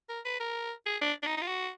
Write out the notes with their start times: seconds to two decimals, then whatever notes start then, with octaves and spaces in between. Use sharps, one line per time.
0.09 A#4
0.25 B4
0.40 A#4
0.86 G#4
1.02 D4
1.23 D4
1.26 D#4
1.38 D#4
1.42 F4
1.48 F#4